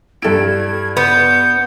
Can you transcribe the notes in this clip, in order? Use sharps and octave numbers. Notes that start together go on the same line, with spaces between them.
G2 E4 A4 G#6 D7
B3 G6